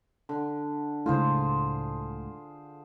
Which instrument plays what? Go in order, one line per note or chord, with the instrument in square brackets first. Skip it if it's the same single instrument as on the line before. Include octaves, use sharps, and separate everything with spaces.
[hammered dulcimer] D3
[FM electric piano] C#2 A2 [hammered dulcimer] F4 G#4 C5